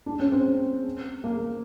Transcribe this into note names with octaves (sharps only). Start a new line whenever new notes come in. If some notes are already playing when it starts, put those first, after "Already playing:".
D4
C#4
C4
A#3